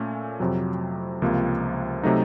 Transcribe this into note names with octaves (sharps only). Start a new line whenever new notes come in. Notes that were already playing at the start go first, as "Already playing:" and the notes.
Already playing: A#2 A3 C#4
F2 C3 F#3
C#2 C3 F3 A#3
C3 F#3 A3 D#4